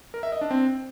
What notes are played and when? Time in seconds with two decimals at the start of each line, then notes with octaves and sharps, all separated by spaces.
0.14 A#4
0.23 E5
0.32 D#5
0.41 D4
0.51 C4